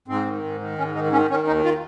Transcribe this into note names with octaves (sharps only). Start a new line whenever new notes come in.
G#2 C4
D#3
G#2
D#3
G#2 C#4
D#3 D#4
D#3 C#4
D#3 C#4
D#2 D#4
F4